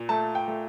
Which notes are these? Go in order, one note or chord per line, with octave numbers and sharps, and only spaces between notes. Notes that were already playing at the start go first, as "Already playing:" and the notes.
Already playing: A#2
A3 A5
G5
A3